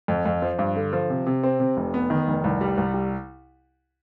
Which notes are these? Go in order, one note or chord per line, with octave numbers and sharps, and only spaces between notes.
F2
F2
F3
G2
D3
F3
C3
C3
C4
C3
F1
B3
D#3
F1
C2
G3
C2
G3